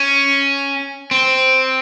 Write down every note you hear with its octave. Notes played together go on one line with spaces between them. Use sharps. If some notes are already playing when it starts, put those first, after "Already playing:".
Already playing: C#4
C4